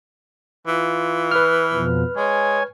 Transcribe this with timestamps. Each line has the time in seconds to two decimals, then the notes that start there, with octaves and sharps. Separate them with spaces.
0.67 E3 F4
1.31 B4 F6
1.72 F2 B2 F3
2.17 G#3 C#5 G#5